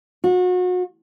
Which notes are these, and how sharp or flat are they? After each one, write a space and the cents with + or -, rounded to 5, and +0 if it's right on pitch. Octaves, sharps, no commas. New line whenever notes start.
F#4 -35